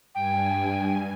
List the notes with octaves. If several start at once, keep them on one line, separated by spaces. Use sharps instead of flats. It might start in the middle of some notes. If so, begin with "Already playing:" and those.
G2 G5 G#5